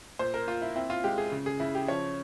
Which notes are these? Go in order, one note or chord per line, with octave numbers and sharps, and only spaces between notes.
A#2 C5
A#4
A#2 F4
E4
C4 E4
F4
G#3 G4
G#4
C#3
G#4
C#3 E4
G4
F3 C#5